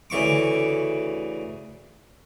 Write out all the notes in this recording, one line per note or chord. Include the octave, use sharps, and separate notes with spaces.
D2 C#3 E3 C#6 D6